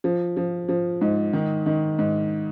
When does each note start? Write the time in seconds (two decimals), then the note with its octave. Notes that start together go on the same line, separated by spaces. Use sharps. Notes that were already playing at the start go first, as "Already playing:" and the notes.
0.04 F3
0.37 F3
0.69 F3
1.01 G#2
1.33 D#3
1.66 D#3
1.99 G#2